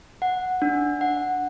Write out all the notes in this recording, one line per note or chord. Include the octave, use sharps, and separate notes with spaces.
F#5
D4
F#5